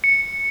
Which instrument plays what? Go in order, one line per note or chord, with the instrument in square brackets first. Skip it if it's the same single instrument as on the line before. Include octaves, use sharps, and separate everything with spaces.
[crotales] C#7